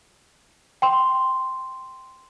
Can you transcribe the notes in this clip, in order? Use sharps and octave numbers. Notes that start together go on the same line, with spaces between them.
G5 C6